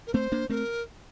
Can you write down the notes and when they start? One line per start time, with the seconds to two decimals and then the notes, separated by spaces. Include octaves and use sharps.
0.07 A#4
0.14 A3 C4 C5
0.32 A#3 D4
0.50 A3 C4 A#4